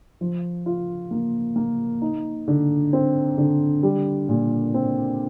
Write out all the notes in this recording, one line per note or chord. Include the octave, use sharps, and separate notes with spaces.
F3
F4
A#3
A#3
D#4
D3
C4
D3
G3
A#2
C4